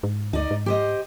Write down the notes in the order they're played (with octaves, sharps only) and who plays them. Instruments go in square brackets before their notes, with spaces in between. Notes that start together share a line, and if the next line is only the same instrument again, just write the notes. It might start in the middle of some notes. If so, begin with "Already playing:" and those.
[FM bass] G#2
[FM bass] D2 [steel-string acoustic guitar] D#4 D5 D#5
[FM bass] G#2
[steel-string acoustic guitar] G4 C5 D#5